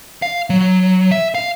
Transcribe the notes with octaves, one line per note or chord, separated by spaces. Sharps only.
F5
F#3
E5
F5